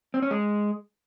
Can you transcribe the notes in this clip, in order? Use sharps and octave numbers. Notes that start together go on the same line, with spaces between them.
C4
C#4
G#3